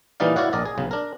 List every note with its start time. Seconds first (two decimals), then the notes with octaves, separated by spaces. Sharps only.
0.20 A#2 E3 G3 D#4 D5 F5
0.36 E4 F#4 C#5 D5 F5 F#5
0.53 A#1 A#4 D5 D#5
0.65 G#4
0.78 B1 C#3
0.91 D4 A#4